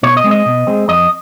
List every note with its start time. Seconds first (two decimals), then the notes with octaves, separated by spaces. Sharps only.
0.03 B2 C#5
0.17 D#5
0.24 G#3 C4
0.31 D#5
0.46 B2
0.67 G#3 C4
0.88 F2 D#5